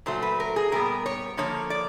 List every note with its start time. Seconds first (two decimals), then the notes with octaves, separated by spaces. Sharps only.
0.06 A#2 F#3 A3 C5
0.22 B4
0.40 A#4
0.56 G#4
0.72 A#2 G3 B3 A#4
1.06 C#5
1.37 D3 F3 A#3 C#5
1.70 D5